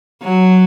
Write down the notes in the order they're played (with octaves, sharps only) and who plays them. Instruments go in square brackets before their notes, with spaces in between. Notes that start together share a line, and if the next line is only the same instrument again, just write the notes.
[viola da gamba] F#3